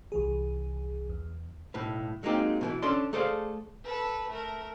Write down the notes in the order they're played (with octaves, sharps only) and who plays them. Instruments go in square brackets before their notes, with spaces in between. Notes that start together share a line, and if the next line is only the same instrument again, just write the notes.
[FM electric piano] C2 E3 G#4
E2
[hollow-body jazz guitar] B1 A2 B4
F#3 G#3 A#3 C4 D#4 G4
B2 D#3 E3
C#4 D4 A4 D5 C6
A3 G#4 A4 C5 D5 F5
[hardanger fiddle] A4 B4
A3 A#4